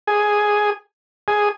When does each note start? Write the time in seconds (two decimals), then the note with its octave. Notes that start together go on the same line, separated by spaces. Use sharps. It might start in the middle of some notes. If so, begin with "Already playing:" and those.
0.07 G#4
1.28 G#4